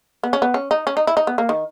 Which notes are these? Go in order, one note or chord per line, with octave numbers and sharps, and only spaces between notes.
B3
C#4
B3
C#4
D#4
C#4
D#4
E4
D#4
B3
A#3
D#3